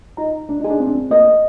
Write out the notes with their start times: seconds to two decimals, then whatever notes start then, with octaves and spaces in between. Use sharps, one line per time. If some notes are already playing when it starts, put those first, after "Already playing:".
0.17 D#4 A#5
0.49 D4
0.60 D#4 G#4
0.70 D4
0.80 C4
0.87 D4
0.95 C4
1.10 A#3 D#5